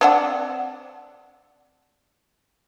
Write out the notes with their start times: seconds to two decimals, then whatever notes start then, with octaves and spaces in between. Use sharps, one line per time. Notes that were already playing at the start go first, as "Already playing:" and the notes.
0.01 C4 D4 F#5